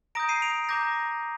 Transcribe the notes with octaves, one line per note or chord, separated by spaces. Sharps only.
A#5 D#6 G6 A#6 D7
C7 D#7
D7 F7
A#5 D6 G6 A#6